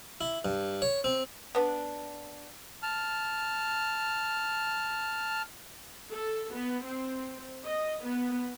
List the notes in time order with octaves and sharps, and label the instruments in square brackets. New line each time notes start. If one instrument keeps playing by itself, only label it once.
[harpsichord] E4
G2
C#5
C4
[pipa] B3 D4
[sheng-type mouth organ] A5 F6
[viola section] A4
B3
C4
D#5
B3